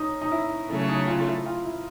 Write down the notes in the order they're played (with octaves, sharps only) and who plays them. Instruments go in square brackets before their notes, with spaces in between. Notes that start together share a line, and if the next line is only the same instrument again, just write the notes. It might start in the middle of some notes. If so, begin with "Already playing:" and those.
Already playing: [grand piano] C#4 D#4
D#4
E4
[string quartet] C#3 F#3 A3 C#4 [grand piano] E4
[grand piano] D#4
F4
F4
E4
F4
E4